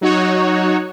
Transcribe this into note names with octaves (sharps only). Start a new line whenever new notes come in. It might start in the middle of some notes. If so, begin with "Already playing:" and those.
F#3 D#4 F#4 C#5